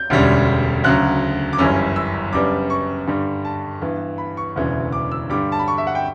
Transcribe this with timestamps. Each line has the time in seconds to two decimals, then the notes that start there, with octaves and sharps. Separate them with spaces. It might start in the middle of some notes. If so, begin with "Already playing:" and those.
Already playing: G6
0.10 E1 D2 D3 G3 C#4
0.84 D2 C#3 F#3 F#6
1.53 D6
1.58 G1 F#2 E3 G3 C#4 E6
1.96 E6
2.33 F#2 C#3 G3 B3 D4 D6
2.70 C#6
3.07 G2 D3 G3
3.45 A5
3.81 G2 E3 B3
4.18 B5
4.37 C#6
4.56 E1 D2 C#3 E3
4.92 D6
5.11 E6
5.30 G2 D3 G3 D6
5.52 A5
5.59 B5
5.68 C#6
5.78 E5
5.87 F#5
5.95 G5